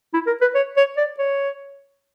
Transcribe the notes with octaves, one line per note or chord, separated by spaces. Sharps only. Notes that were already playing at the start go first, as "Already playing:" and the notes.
E4
A#4
B4
C#5
C#5
D5
C#5